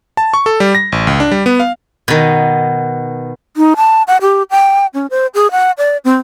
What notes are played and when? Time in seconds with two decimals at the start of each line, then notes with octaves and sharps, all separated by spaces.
0.17 A5
0.34 C#6
0.46 A4
0.60 G3
0.75 A#6
0.92 A1
1.07 C#2
1.20 D4
1.31 G3
1.46 B3
1.60 F5
2.08 B2 D#3
3.57 D#4
3.77 A5
4.08 F#5
4.22 G4
4.51 G5
4.94 C#4
5.10 C5
5.35 G#4
5.51 F#5
5.78 D5
6.05 C4